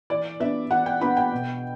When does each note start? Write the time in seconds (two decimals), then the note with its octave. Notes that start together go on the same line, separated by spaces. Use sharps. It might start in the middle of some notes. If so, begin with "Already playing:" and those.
0.10 E3 D5
0.40 B3 D4 E5
0.71 E3 F#5
0.86 G5
1.01 B3 D4 B5
1.17 G5
1.32 B2